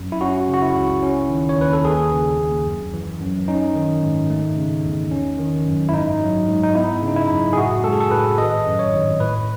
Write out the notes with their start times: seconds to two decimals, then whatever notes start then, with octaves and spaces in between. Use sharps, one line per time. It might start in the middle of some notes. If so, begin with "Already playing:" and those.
Already playing: F#2
0.12 E4
0.21 C#4 F#4
0.48 C#3
0.54 F#4
0.62 E4
0.76 C#2
1.03 C#4
1.30 D#3
1.49 C#5
1.57 D#2 B4
1.73 A4
1.85 D#2 G#4
2.12 C#3
2.39 D#2
2.66 F#2
2.94 E3
3.21 F#2
3.48 C#4 D#4
3.75 D#3
4.03 G#2
4.30 A3
4.57 C#3
4.84 E2
5.11 C#4
5.39 D#3
5.67 F#2
5.89 E4
5.94 G#2 D#4
6.20 F#3
6.49 G#2
6.63 D#4
6.75 B3 E4
7.03 C#3
7.08 D#4
7.16 E4
7.30 F#2
7.53 G#4
7.57 A2 F#4
7.84 G#3 A4
7.93 G#4
8.00 A4
8.11 A2 B4
8.38 G#1 D#5
8.66 F#2
8.79 C#5
8.93 G#1
9.20 A2 B4